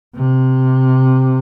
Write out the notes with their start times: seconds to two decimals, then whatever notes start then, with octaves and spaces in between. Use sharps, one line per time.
0.15 C3